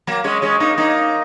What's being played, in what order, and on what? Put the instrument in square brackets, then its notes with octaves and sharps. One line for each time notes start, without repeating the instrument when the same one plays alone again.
[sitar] F#3 A#3
G#3 C#4
G#3 C#4
A#3 D#4
A#3 D#4